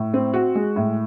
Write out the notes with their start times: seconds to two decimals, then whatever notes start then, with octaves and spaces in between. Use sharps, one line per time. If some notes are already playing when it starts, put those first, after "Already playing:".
Already playing: A2
0.14 C4
0.33 F#4
0.55 G#3
0.76 A2